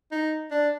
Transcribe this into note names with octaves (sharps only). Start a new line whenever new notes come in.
D#4
D4